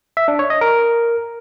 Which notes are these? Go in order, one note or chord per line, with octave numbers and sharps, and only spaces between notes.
E5
D4
C#5
D#5
A#4